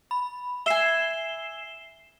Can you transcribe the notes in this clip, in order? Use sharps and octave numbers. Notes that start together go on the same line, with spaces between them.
B5
E5 G#5 C7 E7 G7